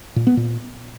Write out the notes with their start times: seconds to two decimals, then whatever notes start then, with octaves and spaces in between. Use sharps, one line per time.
0.16 A#2
0.27 B3
0.37 A#2